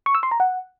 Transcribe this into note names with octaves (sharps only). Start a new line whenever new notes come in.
C#6
E6
C6
A#5
F#5